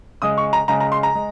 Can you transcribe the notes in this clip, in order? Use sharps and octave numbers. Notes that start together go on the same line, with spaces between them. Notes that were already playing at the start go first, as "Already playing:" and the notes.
C#3 G#3 D#6
C#6
A#5
C#3 G#3 A#5
A#5
C6
A#5
G#3